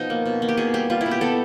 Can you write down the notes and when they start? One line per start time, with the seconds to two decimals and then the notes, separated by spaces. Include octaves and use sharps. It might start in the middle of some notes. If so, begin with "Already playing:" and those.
Already playing: B2 F3 D#4
0.10 A#3
0.26 B2
0.42 A#3
0.49 G4
0.57 B2 G#4
0.74 G3 G4
0.90 G3 F4
1.01 E4
1.06 B2
1.11 G4
1.21 B3 A4